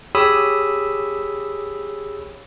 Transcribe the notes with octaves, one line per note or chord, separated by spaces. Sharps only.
G4 G#4 C#5 B5 D#6 E6